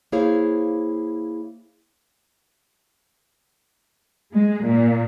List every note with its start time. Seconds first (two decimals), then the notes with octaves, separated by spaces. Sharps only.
0.12 A#3 E4 G#4 C5 C#5 F5
4.33 G#3
4.64 A#2